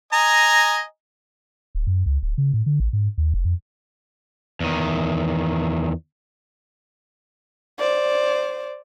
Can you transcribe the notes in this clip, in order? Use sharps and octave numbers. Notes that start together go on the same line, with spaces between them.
D#5 G#5 A#5
D1
F#2
C#2
D1
C#3
A2
D3
A1
G#2
D#2
F1
F2
E2 D#3
C5 D5